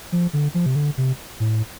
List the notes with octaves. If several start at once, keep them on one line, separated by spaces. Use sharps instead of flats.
F3
D3
F3
C3
D3
C3
A2